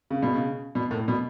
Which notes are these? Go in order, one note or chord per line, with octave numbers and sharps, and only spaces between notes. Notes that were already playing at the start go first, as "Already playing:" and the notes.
C#3
B2
C#3
B2
A2
B2